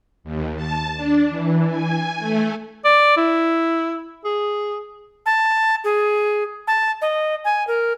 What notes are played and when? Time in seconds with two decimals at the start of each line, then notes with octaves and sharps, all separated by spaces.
0.24 D#2
0.56 A5
0.96 D4
1.30 E3
1.67 G#5
2.19 A3
2.85 D5
3.17 E4
4.25 G#4
5.26 A5
5.84 G#4
6.67 A5
7.01 D#5
7.44 G#5
7.67 A#4